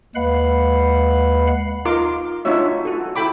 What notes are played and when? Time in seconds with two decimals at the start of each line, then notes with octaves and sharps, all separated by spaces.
0.15 D#2 G#3 B4 F5 F#5 B5
1.85 D#4 F4 A#4 C6 D6
2.45 D4 D#4 F4 F#4 C#5 E5
2.85 F#4 A4
3.16 E4 A4 G5 B5 D6